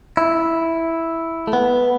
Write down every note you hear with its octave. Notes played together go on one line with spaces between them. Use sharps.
E4
A3
B3